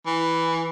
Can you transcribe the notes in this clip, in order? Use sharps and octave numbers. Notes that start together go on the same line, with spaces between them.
E3